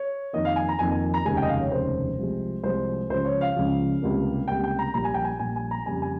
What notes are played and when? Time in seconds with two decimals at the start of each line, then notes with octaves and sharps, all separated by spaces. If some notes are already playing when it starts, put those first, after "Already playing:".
Already playing: C#5
0.33 F2 D#3 A#3 D#5
0.45 F5
0.56 G#5
0.69 A#5
0.79 F2 D#3 A#3 G#5
0.92 G#5
1.14 A#5
1.25 F1 D#2 C#3 G#3 G#5
1.37 G5
1.43 D#5
1.48 F5
1.60 C#5
1.72 F1 D#2 C#3 G#3 C5
2.18 C2 C3 F3 G#3
2.64 C2 C3 F3 G#3 C5
3.09 C#2 C#3 F3 C5
3.25 C#5
3.41 F5
3.56 C#2 C#3 F3
4.02 C#2 C3 G3 A#3
4.48 C#2 C3 G3 A#3 G5
4.64 G5
4.79 A#5
4.94 A#1 A#2 G3 A#5
5.04 G#5
5.14 G5
5.25 G#5
5.39 A#1 A#2 G3 G#5
5.56 G#5
5.71 A#5
5.86 F2 C#3 G3 A#3 G#5
6.02 G#5